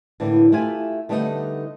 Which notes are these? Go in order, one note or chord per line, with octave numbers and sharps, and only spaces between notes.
A2 D3 E3 A#3
A3 E4 F4 G4 G#5
D3 G3 A3 B3 C4 D#4